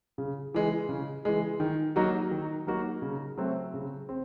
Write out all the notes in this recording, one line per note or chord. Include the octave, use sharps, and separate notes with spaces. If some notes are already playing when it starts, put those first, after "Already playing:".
C#3
E3 G#3
C#3
E3 G#3
D#3
F#3 A#3 D#4 F#4
D#3
F#3 A#3 D#4 F#4
C#3
F#3 A3 C4
C#3
C4